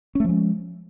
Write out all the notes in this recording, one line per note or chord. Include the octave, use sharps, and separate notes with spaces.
F3 G#3 A3 C#4